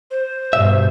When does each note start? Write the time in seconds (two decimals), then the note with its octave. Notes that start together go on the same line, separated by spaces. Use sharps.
0.11 C5
0.53 G2 B2 E5